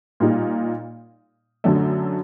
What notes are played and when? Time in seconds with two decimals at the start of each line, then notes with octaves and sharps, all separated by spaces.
0.20 A#2 G3 A#3 D#4
1.64 F#2 D3 F#3 A3